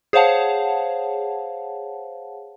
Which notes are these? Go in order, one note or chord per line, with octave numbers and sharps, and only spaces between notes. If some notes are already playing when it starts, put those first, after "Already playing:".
G#4 C5 C#5 F5 F#5 A5